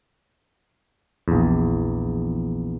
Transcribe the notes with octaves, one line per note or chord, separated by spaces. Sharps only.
A#1 E2